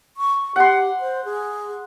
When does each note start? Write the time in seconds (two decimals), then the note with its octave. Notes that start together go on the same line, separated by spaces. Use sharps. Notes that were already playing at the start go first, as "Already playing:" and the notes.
0.17 C#6
0.56 G4 F#5 C6
1.00 C5
1.25 G#4